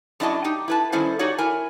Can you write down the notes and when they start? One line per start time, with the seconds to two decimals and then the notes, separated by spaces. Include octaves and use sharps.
0.20 F#2 D4 E4 F#4 D#5 A5
0.44 D#4 G4
0.68 E4 B4 A5
0.92 D#3 G3 C#4 E4 A4 C5
1.19 D#4 F#4 G4 C#5 D5
1.38 E4 A#4 G#5